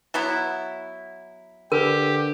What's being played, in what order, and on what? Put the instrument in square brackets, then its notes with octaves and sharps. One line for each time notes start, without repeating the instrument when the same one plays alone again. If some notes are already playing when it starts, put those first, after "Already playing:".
[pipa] F#3 B3 E4
[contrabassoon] D3 [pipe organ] G4 [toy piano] A#4 B4